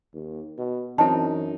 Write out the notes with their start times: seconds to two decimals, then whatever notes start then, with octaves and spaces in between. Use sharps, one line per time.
0.14 D#2
0.58 B2
0.98 F#2 E3 C4 C#4 D#4 A5